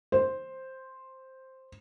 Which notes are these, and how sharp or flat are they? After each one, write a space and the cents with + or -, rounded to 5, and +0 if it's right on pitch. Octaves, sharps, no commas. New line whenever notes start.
C5 +5